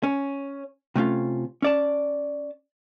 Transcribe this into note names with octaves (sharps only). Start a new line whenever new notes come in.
C#4
C3 A3 C#4 F4
C#4 D5 A5